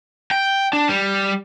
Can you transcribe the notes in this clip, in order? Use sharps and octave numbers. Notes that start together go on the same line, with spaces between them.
G5
D4
G3